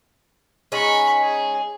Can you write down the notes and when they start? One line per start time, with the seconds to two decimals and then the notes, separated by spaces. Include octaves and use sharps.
0.72 G#3 C#4 D#4 B5 C#6
1.22 G#4